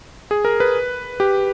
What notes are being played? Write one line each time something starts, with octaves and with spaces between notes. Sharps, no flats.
G#4
A#4
B4
G4